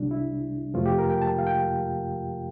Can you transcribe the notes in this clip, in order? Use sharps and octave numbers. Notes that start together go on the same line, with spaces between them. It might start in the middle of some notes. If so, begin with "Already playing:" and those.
Already playing: C2 C3 G3 D4
E4
F2 C3 F3 A3 F4
G4
A#4
G5
A5
F5
G5